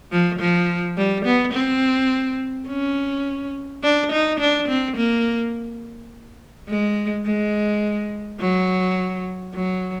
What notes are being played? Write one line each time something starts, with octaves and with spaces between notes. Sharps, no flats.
F3
F3
G3
B3
C4
C#4
D4
D#4
D4
C4
A#3
G#3
G#3
F#3
F#3